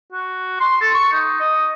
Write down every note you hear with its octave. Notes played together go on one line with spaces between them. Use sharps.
F#4
C6
A4
C#6
D#4
D#5